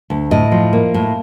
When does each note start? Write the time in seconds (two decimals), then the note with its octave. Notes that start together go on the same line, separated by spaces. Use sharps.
0.10 D2
0.31 A2 D#5
0.52 F3
0.73 A#3
0.94 A2